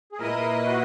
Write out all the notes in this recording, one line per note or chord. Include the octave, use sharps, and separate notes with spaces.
G#4
A#2 A#3 E4 A#4 B4 D#5
F#4